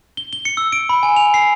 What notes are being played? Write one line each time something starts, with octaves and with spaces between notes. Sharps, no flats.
G7
G7
C#7
E6
D7
B5
G#5
F7
C7